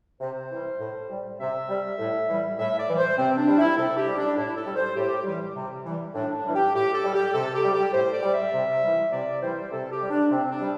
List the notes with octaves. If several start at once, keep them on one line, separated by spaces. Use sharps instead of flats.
C3 C5
E3 G3
A2
G3
C3 E5
G3
A2
E3 G3
A2 E5
D5
E3 G3
C5
C3 C4
D4
G3
E4
C3 A4
G4
G3
D4
A2 E4
A4
G3
C5
A2 G4
E3 G3
C3
E3 G3
A2 D4
D4
E3 G3
G4
A2 G4
A4
G3
G4
C3 A4
G4
G3
G4
A2 C5
D5
G3
E5
C3
E3 G3
C3 D5
E3 G3 C5
C3 A4
G4
G3
D4
C3 C4
D4
G3